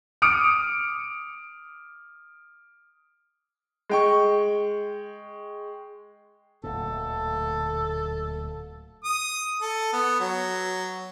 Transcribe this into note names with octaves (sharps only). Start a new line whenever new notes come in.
D6 D#6 F6 C#7 D7
G#3 G5 C#6
D1 D2 A#2 A4
D#6
A4
B3
F#3